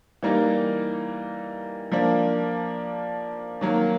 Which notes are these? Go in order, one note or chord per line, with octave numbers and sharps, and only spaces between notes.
E3 G3 A#3 D#4
F3 A#3 D4
D#3 F#3 A#3